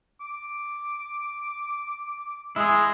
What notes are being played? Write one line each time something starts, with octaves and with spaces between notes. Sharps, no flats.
D6
G#3 E4 G#4